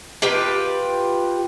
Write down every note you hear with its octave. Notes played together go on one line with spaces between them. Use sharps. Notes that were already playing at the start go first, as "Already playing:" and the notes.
F4 G4 B4 G5